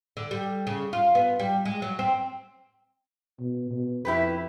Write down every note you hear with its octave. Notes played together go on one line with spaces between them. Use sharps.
D3
G3
C#3
F4
B3
G3
G#3
F#3
C4
B2
B2
F2 E4 G4 B4